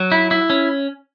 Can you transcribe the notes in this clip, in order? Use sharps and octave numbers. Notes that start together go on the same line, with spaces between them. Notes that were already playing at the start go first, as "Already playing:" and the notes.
Already playing: F#3
E4
E4
C#4